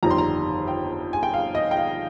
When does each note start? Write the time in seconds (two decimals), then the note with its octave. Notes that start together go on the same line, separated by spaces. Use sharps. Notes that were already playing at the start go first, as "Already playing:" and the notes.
0.03 G1 F2 D#3 G3 A#5
0.10 C6
0.18 A#5
0.68 G5
1.13 G#5
1.23 G5
1.34 F5
1.55 D#5
1.71 G5
1.77 F5